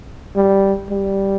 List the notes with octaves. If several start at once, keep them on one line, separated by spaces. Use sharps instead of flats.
G3
G3